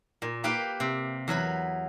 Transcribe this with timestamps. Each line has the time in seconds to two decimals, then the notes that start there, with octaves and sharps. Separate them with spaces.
0.22 A#2
0.44 A#3 G4 B4 F5 G5
0.80 C3
1.28 E2 F#3 B4 B5